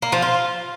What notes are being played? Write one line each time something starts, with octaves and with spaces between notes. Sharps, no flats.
A#3
F3
F4